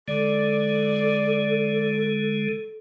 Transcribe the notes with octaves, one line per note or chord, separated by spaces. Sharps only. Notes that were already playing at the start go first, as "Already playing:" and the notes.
D3 G#3 A4 D5